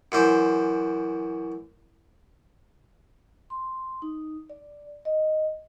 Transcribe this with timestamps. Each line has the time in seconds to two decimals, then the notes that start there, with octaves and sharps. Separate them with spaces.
0.12 F#2 E3 C5
3.50 C6
4.02 D#4
4.50 D5
5.05 D#5